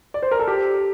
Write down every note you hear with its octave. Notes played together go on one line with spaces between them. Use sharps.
D5
C5
A#4
A4
G4